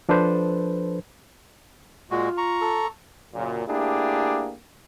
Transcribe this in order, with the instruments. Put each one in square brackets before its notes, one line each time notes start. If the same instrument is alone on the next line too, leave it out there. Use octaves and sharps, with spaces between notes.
[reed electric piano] F3 D4 A4 B4 C5
[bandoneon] A#2 G#3 F#4 [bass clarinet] F4
[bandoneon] A#5 C#6
[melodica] A4
[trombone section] F#2 A#2 C#3
A3 A#3 D4 E4 G4 G#4